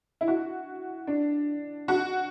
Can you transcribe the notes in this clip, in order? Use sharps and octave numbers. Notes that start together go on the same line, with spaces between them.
E4
F#4
D4
F#4